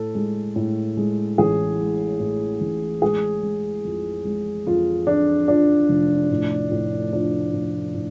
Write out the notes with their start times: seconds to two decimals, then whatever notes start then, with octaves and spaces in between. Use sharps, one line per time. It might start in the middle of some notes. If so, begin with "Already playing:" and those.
Already playing: A2 A4
0.15 G#3
0.56 A2
0.97 G#3
1.38 A1 G#4
1.79 G#3
2.20 A2
2.61 A1
3.02 G#3 G#4
3.43 G#3
3.85 F2
4.25 G#3
4.67 F2 F4
5.07 F2 D4
5.48 F3 D4
5.89 F1
6.30 A2
6.71 A2
7.13 F3 D4
7.54 A2
7.94 A2